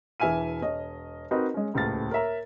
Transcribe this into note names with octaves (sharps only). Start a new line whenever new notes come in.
E1 E3 E5 G#5 F6 D#7
E1 C#5 D#5
C4 D#4 F#4 A#4 B4
G#3 C#4
D#1 C#2 A2 F6 A6
A#4 C#5 E5 A#5